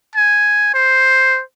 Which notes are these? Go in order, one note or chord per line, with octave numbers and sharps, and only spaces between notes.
G#5
C5